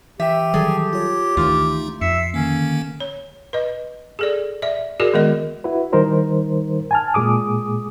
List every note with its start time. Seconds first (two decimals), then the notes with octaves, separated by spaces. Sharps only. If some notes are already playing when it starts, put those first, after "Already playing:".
0.20 E3 G4 E5 G5
0.54 D#3 F#3 G3 G#4 A4
0.93 F4 C#5
1.37 D2 D#3 E3 A3 D#4 F4
2.01 F2 E5 C7 C#7
2.34 D3 D#3 A#3 C#4
3.00 C#5
3.53 B4 D#5
4.19 G#4 A4 D5
4.62 D5 E5
5.00 E4 F#4 G#4 A#4 D5
5.14 D#3 G#3 B3 A#4 D#5
5.64 E4 F#4 B4
5.93 D#3 G3 D#4 A#4 C5
6.91 G#5 A5 F6
7.14 A#2 G#3 G#4 D6 D#6